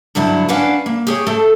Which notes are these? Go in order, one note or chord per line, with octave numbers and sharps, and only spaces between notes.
G2 D3 F#3 D4 E4
C#4 D4 B4 D5 F5 F#5
A#3
G4 G#4 C#5
A3 A4